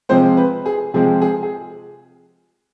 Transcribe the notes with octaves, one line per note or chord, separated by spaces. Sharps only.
C3 F3 G#3 C4 C5
B4
G#4
C3 F3 G#3 C4 G#4
G#4
G#4